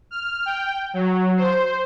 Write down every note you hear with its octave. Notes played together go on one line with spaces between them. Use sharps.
F6
G5
F#3
C5